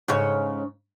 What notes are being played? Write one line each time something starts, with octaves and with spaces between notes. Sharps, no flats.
G#2 C#3 C#5